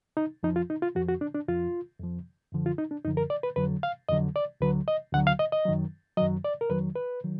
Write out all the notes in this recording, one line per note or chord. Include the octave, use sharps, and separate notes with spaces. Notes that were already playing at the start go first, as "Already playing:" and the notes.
D#4
F2 F3 D#4
F4
D#4
F4
F2 F3 F#4
F#4
D4
D4
F2 F3 F4
F2 F3
F#2 D3 F3
F4
D#4
D4
F#2 D3 F3 D#4
A#4
D5
B4
F2 D3 F#3 B4
F5
F2 D3 F#3 D#5
D5
D2 D3 F#3 B4
D#5
D2 D3 F#3 F#5
F5
D#5
D#5
F#2 D#3 F#3
F#2 D#3 F#3 D#5
D5
A#4
F2 D#3 F#3 B4
B4
D#3 F#3